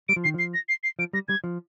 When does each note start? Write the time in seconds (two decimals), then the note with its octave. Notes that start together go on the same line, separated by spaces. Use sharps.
0.09 G3 D7
0.16 F3
0.24 D#3 C7
0.34 F3 C7
0.54 A#6
0.69 C7
0.84 C7
0.99 F3 D7
1.13 G3 A#6
1.28 G3 G#6
1.44 F3